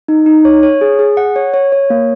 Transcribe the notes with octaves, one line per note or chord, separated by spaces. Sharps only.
D#4
D#4
C#5
C#5
G#4
G#4
F#5
C#5
C#5
C#5
A#3